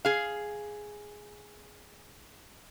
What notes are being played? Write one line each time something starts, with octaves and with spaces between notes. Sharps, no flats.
G#4 F5